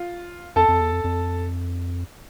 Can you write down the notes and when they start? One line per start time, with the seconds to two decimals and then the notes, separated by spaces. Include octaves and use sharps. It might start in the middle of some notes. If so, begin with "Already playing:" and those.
Already playing: F4
0.56 F2 A4 A5
0.68 F2
0.81 E2
0.92 F2
1.04 F2